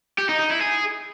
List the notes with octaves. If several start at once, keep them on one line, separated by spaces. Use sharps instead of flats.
G4
D#4
D#4
E4
G#4